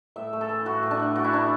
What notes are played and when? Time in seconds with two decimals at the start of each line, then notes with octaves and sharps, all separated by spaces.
0.16 A2 E5
0.33 A3
0.41 A4
0.49 E3
0.65 A2 F#4
0.83 A2
0.91 D4
0.99 A3
1.16 E3 F#4
1.24 E4
1.32 A2 D4